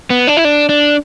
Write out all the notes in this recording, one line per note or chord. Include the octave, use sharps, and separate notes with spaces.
B3
D4
E4
D4
D4